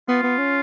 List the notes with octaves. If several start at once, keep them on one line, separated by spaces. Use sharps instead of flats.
B3 F4
B3
C#4